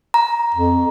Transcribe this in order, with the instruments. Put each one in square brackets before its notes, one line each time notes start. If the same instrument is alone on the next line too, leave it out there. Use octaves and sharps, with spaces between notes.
[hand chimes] A#5
[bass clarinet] F2